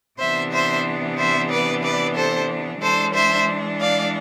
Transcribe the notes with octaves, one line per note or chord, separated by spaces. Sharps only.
C3 E3 B3 D4 C5 E5
C5 E5
C5 E5
B4 D5
B4 D5
A4 C5
E3 G#3 D4 A4 C5
C5 E5
D5 F5